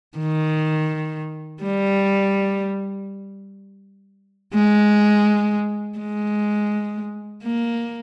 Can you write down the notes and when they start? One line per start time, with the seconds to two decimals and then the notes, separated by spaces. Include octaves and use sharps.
0.18 D#3
1.63 G3
4.54 G#3
5.99 G#3
7.43 A#3